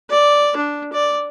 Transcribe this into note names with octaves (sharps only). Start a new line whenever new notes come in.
D5
D4
D5